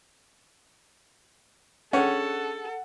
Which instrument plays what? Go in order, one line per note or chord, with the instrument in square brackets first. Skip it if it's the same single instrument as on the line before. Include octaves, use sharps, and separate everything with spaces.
[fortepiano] C#4 [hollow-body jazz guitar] D4 G#4 G5 [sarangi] A4 [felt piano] F#5